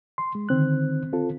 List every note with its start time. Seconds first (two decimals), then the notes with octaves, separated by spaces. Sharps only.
0.18 C6
0.35 G#3
0.49 D3 D#3 C4 F#6
1.13 C4 F4 A4